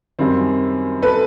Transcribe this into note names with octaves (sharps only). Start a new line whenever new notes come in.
F#2 D#3 G3 C4
A4 B4